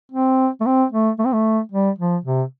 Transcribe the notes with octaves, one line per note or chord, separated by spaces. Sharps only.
C4
A3
C4
A3
A3
C4
A3
G3
F3
C3